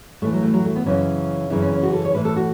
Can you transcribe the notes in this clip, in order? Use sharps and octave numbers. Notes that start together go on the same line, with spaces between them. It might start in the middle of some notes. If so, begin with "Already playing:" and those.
A2 E3 A3
F#3
A3
F#3
A3
B3
F#2 C#3 E3 C#4
F#2 C#3 E3 E4
C#4
C#4
F#4
A4
C#5
A2 E3 B4
A4
F#4